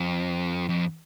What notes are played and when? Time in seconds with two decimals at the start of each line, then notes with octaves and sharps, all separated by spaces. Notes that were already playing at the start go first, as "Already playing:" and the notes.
Already playing: F2
0.69 F2